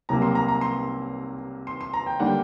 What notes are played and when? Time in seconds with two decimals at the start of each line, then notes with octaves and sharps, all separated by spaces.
0.09 C2 C3 F#3 A#3 A#5
0.22 C6
0.35 A#5
0.48 A#5
0.61 C6
1.67 C6
1.81 C6
1.94 A#5
2.06 G5
2.20 D3 G3 A#3 D4 F#5
2.26 G5